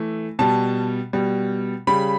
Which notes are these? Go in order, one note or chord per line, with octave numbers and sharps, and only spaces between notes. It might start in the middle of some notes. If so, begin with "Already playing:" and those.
Already playing: E3 A3
B2 G3 A5
B2 G3
C#3 G3 B5